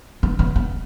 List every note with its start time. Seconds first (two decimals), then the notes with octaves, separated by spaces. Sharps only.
0.23 B3
0.39 B3
0.56 B3